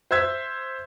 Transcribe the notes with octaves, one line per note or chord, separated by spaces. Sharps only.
C5 E5 E6 G#6 B6